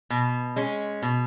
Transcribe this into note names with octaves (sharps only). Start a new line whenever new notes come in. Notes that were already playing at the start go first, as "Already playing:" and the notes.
B2
G#3 C#4
B2